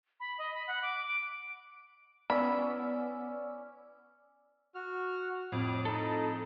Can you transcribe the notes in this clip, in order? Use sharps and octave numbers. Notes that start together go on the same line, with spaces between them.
B5
D#5
B5
F#5
D6
D7
B3 C#4 E4 D5 B5 C#6 D6 E6
F#4 F6
F2 A2 D6
D#4 A4